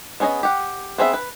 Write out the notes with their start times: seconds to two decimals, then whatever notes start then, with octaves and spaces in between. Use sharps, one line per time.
0.20 B3 C#4 G#4 C#5 D#5
0.43 G4 F#5
0.98 B3 C4 G#4 D5 E5
1.13 B4